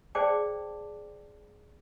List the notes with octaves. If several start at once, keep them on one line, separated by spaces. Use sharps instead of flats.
G#4 C5 D5 G5 A5 D6